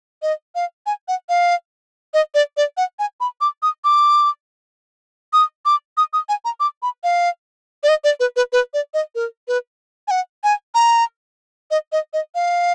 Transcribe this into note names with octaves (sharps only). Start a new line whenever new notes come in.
D#5
F5
G#5
F#5
F5
D#5
D5
D5
F#5
G#5
B5
D6
D#6
D6
D#6
D6
D#6
D#6
G#5
A#5
D6
B5
F5
D5
D#5
D5
B4
B4
B4
D5
D#5
A#4
B4
G#5
F#5
G#5
A#5
D#5
D#5
D#5
F5